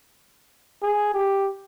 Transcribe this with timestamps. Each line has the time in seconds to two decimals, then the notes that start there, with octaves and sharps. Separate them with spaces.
0.82 G#4
1.14 G4